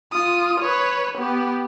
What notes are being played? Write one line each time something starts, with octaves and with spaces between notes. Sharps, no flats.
F4 D#6
B4 C#5
B3 G4